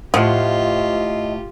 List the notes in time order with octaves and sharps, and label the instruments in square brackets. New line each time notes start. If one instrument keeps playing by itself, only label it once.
[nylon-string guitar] A2 F#5 [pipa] F3 [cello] F4 G4 [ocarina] D#5